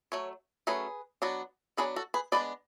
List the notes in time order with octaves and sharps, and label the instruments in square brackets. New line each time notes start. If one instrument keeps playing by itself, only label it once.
[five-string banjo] F#3 A3 C#5
F#3 A3 C#4 G#4 B4
F#3 B3 D4
F#3 B3 D4 G#4 B4
F#4 A4
G#4 B4
G#3 B3 D4 B4 D5